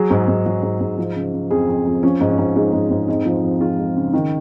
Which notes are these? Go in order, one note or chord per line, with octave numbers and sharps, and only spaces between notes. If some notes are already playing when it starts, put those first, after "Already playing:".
Already playing: F#3 G#4
G#2
G#2
F#3
G#2
G#2
F3
C#3
C#3
F2 G#4
F2
F2
F3 C#4
G#2
C#4
G#2
G#3 D#4
G#2
G#2
F2 D#4
F3
F2
G#3 F4
G#3
C#3
D#3